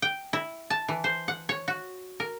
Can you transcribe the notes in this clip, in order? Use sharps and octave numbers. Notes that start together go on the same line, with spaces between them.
G5
E4
A5
E3
C5
F#5
C#5
F#4
A#4